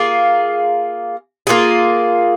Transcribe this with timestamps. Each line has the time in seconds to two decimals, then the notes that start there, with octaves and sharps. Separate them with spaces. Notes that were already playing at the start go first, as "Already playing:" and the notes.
Already playing: A#3 F4 G#4
1.47 A#3 F4 G#4